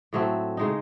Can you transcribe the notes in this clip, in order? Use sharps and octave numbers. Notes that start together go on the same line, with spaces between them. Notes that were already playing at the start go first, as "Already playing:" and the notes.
A2 F#3 A3 C4
C#3 G#3 D#4